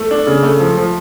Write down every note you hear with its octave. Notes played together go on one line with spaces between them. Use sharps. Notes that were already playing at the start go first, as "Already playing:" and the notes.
Already playing: A3
D4
C#3
A3
F3
F3